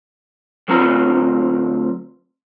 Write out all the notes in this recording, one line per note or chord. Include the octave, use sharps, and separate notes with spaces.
D2 F#3 C4 F4 A#5